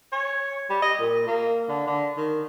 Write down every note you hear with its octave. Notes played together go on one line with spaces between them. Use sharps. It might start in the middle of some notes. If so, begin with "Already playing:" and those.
C#5
G3
D#5
A#2
A#3
D3
D3
D#3